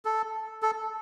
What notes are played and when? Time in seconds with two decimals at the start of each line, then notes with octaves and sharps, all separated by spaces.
0.05 A4
0.62 A4